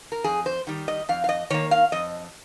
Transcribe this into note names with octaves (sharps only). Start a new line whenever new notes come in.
A#4
F2 G#4
C5
D#3 G3
D#5
F2 F5
F5
D#5
D#3 A#3 C#5
F5
F2 D#5